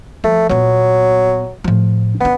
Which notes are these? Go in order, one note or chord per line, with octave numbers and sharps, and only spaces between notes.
F3 A3
A#2 F#3 B3
A2 F3
D3 B3 D4